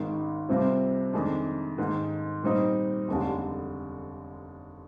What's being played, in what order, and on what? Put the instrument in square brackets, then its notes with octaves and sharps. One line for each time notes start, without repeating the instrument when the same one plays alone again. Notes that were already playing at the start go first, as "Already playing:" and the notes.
Already playing: [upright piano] G#1 G#2 D#3
C2 C3 G3 C4 F4
F2 D#3 G#3 D4
G#2 D#3 A#3
A#2 G3 C4 D#4
F1 D#2 D3 G#3 D4